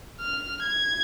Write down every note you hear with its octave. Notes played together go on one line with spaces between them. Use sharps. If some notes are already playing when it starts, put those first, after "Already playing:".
F6
G#6